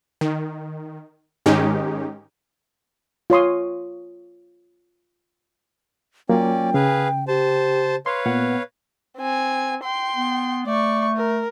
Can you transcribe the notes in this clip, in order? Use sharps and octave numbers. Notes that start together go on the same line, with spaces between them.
D#3
G#2 D#3 G#3 C#4 D#4 G4
F4 C#5 C6 D#6
F#3 A#3 C#4 F4 D5 G5
C#3 G#4 B4 F5
G4 C5 A5
B4 C#5 F5 C6
A#2 B3 F#5
C4 G#5
G5 C6
B3
A3 D5 C#6
A#4